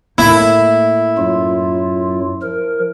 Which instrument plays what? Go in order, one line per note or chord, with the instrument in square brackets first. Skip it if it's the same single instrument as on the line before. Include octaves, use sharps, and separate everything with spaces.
[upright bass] A2 A#3 [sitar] E4
[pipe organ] F#2 F#3 F4
F3 A#4